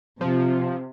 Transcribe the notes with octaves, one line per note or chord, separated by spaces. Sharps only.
C3 F3